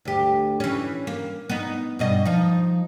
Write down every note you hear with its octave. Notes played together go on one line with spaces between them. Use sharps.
D2 G4
E3 C#4
A#3
B3 D#4
G2 B2 D#5
F3 D#4